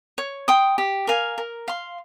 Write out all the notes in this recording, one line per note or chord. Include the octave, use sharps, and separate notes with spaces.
C#5
G5 C6 D#6
G4
A#4 F5 G#5
A#4
F5 C6